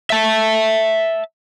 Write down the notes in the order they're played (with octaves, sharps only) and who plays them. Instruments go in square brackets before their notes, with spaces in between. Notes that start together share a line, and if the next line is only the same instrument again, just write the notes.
[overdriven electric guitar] E5 A5